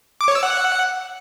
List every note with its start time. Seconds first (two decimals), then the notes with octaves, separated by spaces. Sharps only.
0.21 D6
0.28 C#5
0.35 E6
0.43 F#5